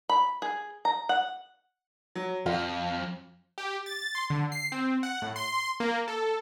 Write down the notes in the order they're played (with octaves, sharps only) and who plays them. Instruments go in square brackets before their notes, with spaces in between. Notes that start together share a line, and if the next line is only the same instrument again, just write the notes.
[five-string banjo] B5
G#4
A#5
F#5
[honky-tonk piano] F#3
[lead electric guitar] F2 [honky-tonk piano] F4
[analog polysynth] G4
A6
C6
D3
C7
C4
F#5
A2
C6
A#3
A4